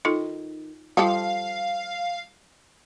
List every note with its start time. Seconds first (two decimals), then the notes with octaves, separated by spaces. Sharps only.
0.05 D#3 D#4 F4 A4
0.97 F3 G3 F4 G4 A4 F5